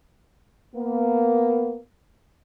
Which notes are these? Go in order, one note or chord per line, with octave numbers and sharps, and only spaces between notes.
A#3 B3